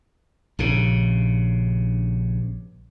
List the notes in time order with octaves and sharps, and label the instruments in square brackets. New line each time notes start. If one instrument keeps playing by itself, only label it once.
[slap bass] A#1 G2 C#3